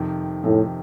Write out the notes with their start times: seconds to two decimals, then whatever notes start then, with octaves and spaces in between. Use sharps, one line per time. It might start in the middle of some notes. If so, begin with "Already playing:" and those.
Already playing: F2 C3 D#3
0.43 F2 A2 C3 D#3